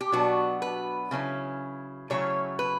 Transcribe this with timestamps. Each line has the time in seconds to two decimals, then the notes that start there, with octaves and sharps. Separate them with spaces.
0.01 G4
0.12 B2 F#3 B3 D4 F#4
0.62 B4
1.11 C#3 F#3 C#4 E4
2.10 C#3 F#3 A3 C#4 E4 C#5
2.59 B4